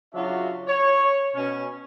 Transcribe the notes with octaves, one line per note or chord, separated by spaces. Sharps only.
C#3 F#3 D4 F4 F#4 E5
C#5
B2 C#4